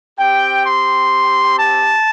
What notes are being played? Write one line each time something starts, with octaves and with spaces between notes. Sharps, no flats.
C4 G4 G5
C6
A5